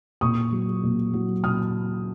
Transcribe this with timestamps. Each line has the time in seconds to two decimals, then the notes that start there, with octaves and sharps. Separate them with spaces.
0.21 A#2 C#6 D#6
0.52 F#3
0.83 A#2
1.13 F#3
1.44 A#2 D#6 F6